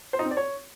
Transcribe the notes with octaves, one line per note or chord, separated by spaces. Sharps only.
C5
D#4
C4
D5
C#5